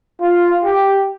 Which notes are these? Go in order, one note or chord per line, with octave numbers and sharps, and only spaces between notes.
F4
G4